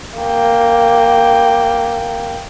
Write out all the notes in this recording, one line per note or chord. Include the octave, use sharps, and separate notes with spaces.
A#3 G5